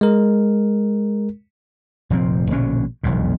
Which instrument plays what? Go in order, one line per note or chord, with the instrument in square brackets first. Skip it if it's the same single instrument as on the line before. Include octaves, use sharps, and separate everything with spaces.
[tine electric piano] G#3 A#4
[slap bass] F1 A#2 F3 C4
A#1 B2 D3 C#4
E1 B1 F2 A#2